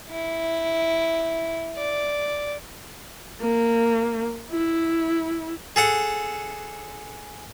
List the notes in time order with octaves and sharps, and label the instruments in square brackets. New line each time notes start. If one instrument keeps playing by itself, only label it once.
[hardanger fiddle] E4
D5
[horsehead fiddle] A#3
E4
[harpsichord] G#4 A4 F#5